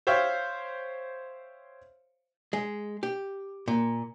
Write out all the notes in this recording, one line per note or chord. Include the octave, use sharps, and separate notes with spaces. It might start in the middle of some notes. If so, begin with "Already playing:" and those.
C5 C#5 E5 F5 G5
G#3
G4
A#2